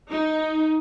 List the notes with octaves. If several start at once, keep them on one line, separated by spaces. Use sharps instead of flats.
D#4